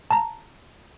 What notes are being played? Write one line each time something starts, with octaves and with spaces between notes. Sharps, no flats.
A5 A#5